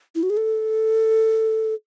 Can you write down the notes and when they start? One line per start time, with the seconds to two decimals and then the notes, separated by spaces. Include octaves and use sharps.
0.15 E4
0.23 F#4
0.30 G#4
0.37 A4